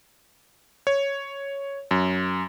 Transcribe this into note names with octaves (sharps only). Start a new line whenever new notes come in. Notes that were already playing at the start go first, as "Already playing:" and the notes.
C#5
F#2